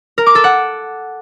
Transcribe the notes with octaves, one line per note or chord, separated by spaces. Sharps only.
A#4
D6
A4
F#5